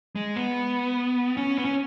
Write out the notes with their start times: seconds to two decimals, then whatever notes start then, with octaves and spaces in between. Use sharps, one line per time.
0.15 G#3
0.36 B3
1.37 C#4
1.58 B3
1.65 C#4